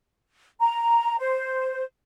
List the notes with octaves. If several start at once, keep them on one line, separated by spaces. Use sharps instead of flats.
A#5
C5